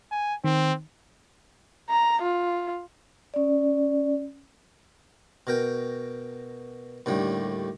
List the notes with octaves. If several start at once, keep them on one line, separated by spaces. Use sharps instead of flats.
G#5
D#3 C4
A#5
F4
C#4 D5
B2 A#4 G5
D#2 A2 D3 G3